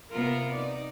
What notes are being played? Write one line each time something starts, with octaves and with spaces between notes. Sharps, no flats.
C3 B3 F4 A#4
D#4 D5